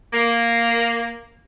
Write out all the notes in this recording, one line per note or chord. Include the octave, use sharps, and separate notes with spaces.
A#3